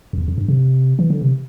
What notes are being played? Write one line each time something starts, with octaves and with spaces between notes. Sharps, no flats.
F2
E2
F2
G2
C3
E3
D3
C3